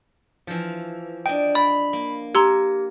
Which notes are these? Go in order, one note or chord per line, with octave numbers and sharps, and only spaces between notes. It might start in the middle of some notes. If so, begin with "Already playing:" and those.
E3 F3
D4 D#5 G5
D5 B5
A#3
G4 A#4 A#5 C6 E6